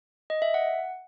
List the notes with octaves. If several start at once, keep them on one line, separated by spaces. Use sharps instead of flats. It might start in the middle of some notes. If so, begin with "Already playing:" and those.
D#5
E5
F#5